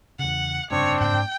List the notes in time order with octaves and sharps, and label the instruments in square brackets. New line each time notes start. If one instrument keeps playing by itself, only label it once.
[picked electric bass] E2 C#3 [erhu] F#5
[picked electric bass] F1 G2 C#3 [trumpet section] C4 D4 [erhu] C#5
[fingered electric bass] G#2 A#3 [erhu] G5